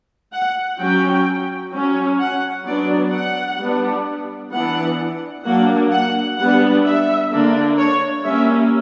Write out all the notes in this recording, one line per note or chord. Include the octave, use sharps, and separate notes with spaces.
F#5
F#3 C#4 G5
F#3 C#4
F#5
F#3 B3 D4 D5
F#5
G3 B3 D4
E3 B3 D4 F#5
F#3 A#3 D4 F#5
F#5
G3 B3 D4 F#5
E5
D3 A#3 D4
C#5
G3 A#3 C#4 E5